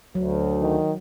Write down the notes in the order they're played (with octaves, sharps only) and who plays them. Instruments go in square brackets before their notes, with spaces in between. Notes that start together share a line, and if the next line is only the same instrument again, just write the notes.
[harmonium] D2 [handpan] F#3
[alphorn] D#3